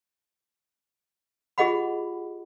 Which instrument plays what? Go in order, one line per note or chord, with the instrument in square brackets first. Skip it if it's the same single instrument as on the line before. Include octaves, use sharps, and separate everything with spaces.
[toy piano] F4 G4 G#4 D#5 F#5 B5